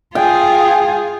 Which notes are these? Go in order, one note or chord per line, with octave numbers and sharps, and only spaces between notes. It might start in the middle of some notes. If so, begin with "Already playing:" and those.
F4 G#4 G5